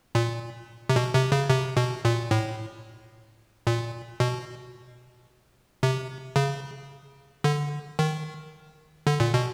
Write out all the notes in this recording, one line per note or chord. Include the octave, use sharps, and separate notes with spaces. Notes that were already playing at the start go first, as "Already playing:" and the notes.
A#2
C3
B2
C3
C#3
C3
B2
A#2
A2
A#2
B2
C3
C#3
D3
D#3
D3
A#2
B2